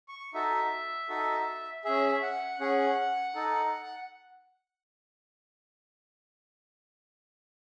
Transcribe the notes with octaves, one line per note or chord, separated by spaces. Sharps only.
C#6
D#4 F#4 A4 E5
D#4 F#4 A4
C#4 G#4 E5
F#5
C#4 G#4 F#5
D#4 A4